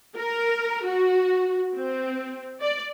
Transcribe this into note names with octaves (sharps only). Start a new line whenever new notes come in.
A#4
F#4
C4
D5